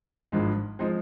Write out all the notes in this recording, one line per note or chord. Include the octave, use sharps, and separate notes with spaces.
G#1 G2 F3 G#3
F3 G#3 C4 D#4